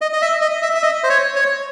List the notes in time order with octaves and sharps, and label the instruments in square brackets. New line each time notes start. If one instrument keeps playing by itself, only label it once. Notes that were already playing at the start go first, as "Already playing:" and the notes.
[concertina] D#5
D#5
E5
D#5
E5
E5
D#5
C5
C#5
C#5